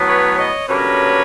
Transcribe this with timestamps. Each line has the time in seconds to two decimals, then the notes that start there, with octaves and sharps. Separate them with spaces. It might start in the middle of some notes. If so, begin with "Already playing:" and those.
Already playing: A2 F#3 B3
0.08 B4 C#5
0.38 C#5 D#5
0.68 G2 D3 F#3 A#3 C#4 B4 C#5